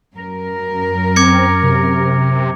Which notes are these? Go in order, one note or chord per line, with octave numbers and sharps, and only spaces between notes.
F#2 A#4
C4 D6 G#6 C#7
C3